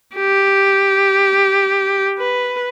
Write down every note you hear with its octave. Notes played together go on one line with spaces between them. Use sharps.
G4
B4